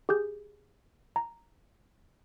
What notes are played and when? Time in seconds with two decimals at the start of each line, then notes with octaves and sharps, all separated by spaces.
0.09 G4 G#4 G6
1.16 A#5